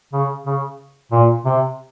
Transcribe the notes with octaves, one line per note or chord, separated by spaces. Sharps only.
C#3
C#3
A#2
C3